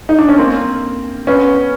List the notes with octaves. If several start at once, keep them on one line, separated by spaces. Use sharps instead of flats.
D#4
D4
C#4
A#3 C4
B3 C#4